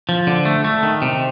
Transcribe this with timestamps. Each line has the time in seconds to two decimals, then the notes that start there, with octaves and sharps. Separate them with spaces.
0.09 F3
0.27 D3
0.45 A3
0.65 A3
0.83 D#3
1.02 C3